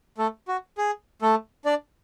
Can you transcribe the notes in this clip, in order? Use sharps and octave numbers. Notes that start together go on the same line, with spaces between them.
A3 A4
F#4
G#4
A3 A4
D4 D5